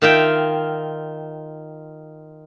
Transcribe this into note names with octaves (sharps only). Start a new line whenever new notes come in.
D#3 F4 E5 G5